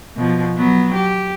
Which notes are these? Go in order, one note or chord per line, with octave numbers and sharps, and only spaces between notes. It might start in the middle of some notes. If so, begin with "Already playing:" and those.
B2 F3
F#3 B3
G4